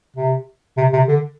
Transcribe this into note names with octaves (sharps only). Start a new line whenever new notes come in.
C3
C3
C3
D3